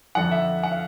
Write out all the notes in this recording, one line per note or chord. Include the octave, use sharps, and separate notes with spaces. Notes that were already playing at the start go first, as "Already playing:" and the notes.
F2 D3 F3 F#5
E5
F#5
F5